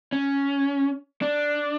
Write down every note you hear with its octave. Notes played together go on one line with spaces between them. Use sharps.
C#4
D4